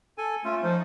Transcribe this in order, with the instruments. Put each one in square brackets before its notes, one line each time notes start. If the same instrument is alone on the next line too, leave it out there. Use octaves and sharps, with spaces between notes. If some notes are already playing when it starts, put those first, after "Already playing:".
[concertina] A4 G#5
[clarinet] A3 [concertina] C#4 F4
[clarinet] F3 [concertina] D#4